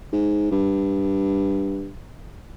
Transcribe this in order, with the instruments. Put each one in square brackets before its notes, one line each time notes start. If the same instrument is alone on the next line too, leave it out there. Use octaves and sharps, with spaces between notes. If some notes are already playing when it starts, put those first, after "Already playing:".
[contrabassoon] G#2
G2